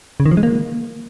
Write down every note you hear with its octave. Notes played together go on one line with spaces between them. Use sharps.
C#3
D#3
F3
G#3
A#3